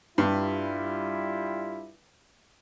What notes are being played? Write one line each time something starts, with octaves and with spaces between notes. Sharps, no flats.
G2 G3 E4 F4